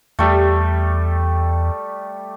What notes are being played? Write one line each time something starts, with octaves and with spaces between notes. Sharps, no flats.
E2 G3 A3